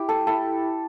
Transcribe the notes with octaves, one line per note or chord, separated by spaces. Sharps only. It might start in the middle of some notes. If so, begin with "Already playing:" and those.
Already playing: E4 G4
A3 A4
E4 A4